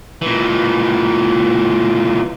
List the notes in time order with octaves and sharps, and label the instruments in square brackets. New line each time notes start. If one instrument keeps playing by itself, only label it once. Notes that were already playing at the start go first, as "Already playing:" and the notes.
[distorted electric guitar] A#2 E3